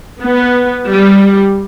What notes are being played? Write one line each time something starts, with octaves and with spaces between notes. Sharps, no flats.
B3
G3